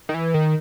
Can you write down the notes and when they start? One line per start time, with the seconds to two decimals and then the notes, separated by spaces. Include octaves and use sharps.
0.09 D#3
0.14 E3
0.34 D#3